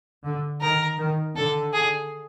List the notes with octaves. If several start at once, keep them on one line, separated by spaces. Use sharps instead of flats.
D3
D#3 A#4
D#3
D3 A4
G#4